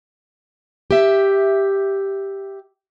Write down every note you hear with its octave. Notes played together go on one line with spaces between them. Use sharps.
G4 E5